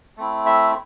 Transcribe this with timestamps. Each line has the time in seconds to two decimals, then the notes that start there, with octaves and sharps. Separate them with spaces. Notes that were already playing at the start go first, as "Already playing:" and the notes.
0.17 A3 C4 E4
0.46 E5